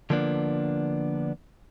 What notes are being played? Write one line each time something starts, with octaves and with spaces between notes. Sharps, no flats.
D3 F3 A#3 B3 D4